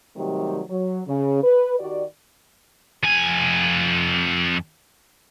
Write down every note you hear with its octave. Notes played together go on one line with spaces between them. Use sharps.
C3 D#3 F#3 G3 A3 G4
F#3
C#3
B4
D#3 F#4 G4 D5
F2 G#5